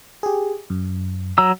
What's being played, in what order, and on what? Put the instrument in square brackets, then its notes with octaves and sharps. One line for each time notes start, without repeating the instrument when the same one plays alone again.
[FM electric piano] G4 G#4
F#2
[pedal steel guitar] F#3 A#5 E6